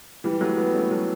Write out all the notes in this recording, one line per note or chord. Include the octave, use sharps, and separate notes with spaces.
E3 G3
F#3 A3
G3 B3
A3 C#4
F#3 A3